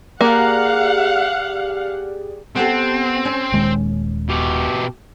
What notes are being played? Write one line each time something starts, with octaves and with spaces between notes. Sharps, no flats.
A#3 G4 G#4 D5 F5 F#5
B3 C4 G4 A4
C#4
D#1 D#2 G#3
B2 G4